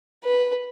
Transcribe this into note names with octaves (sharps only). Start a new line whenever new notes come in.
B4